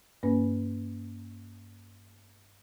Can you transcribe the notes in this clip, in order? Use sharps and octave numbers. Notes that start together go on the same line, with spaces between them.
G2 A#3 C#4 B4